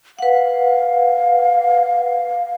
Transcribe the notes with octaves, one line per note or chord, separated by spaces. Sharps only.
B4 F5 F#5